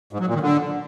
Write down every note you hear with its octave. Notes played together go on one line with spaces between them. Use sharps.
G#2
F#3
A#2
D#3
D3